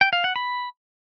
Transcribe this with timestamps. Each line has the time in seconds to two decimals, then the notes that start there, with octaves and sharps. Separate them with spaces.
0.01 G5
0.13 F5
0.24 F#5
0.36 B5